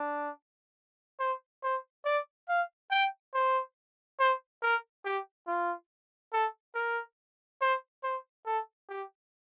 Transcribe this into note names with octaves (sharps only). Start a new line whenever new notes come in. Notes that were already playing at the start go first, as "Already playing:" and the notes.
Already playing: D4
C5
C5
D5
F5
G5
C5
C5
A#4
G4
F4
A4
A#4
C5
C5
A4
G4